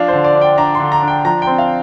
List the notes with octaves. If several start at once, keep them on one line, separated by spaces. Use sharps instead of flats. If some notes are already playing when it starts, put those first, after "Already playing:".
Already playing: F3 D4 F5
D3 C5
D5
D4
G5
D4 A#5
C6
D3
A#5
D4 G5
F3 A#5
G5
C4
F5